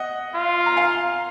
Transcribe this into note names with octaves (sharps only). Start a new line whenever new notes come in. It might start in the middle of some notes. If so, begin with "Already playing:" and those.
Already playing: D#5 F#5
F4
A#5
F5 G#5